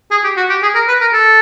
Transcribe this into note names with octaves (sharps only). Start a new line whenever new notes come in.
G#4
G4
F#4
G4
G#4
A#4
B4
A#4
A4